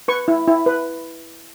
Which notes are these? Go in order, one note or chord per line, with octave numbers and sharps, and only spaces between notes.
B4 C#6
E4
E4
B4